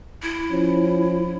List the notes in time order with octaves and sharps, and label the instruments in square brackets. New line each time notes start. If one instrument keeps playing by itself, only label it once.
[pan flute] E4
[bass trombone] F3 [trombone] C#4